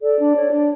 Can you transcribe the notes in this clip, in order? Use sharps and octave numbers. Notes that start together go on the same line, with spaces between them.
A4 D5
D4
C#5
D4